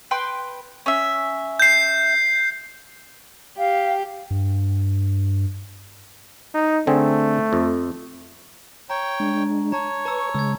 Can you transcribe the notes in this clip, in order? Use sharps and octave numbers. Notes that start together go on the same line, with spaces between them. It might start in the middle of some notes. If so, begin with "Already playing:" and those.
B4 G5 C6
C#4 E5
G6 C7
G4 F5
G2
D#4
D3 A3 C4 G#4
F2
C#5 G5 A#5
G#3 D4
C#5 A5 A#5
B4 A5 A#5 C#6 E6
C#3 G#3 E6 G#6